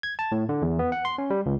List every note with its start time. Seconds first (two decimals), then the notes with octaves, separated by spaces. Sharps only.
0.03 G#6
0.19 A5
0.32 A2
0.49 D3
0.62 E2
0.79 B3
0.92 F#5
1.05 C6
1.18 C#4
1.30 G3
1.46 C#2